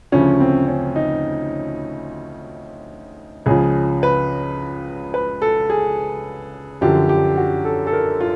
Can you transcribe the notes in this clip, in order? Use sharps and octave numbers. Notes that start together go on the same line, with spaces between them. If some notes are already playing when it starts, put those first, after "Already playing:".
D2 C#3 F3 C#4
C4
C#4
D#4
C#2 C#3 F3 G#4
B4
B4
A4
G#4
F#2 D3 F3 G4
G4
F#4
A4
A4
A#4
F4